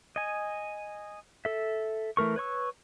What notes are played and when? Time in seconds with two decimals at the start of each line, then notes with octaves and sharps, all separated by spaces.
0.16 D#5 G#5
1.45 A4 E5
2.17 E3 A3 A#4 C#6
2.36 B4 C#5 C#6 E6